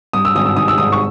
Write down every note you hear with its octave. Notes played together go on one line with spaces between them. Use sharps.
G2 D#6
E6
G#1 D#6
E6
D#3 D#6
E6
G#1 D#6
C#6